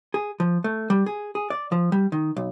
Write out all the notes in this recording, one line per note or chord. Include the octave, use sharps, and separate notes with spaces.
G#4
F3
A3
G3
G#4
G#4
D5
F3
G3
D#3
B1